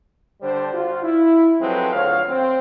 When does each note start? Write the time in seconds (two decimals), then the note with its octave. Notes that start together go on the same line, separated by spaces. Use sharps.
0.41 D3 G3 D4 C5
0.73 F4 F#4
1.03 E4
1.61 F3 F#3 G#3 C4 A4 B4
1.93 D2 F3 F#4 C#5 F5
2.28 C4